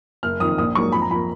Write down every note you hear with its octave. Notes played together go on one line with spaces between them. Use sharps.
F#1 F6
F2 D#3 D#6
A#1 D#6
G#2 F#3 A#3 C#6
F2 B5
A#5
F3 A#3 B5